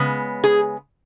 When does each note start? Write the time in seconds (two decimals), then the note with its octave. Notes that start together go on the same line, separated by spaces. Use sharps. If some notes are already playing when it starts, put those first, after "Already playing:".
Already playing: C#3 G#3 B3
0.44 G#4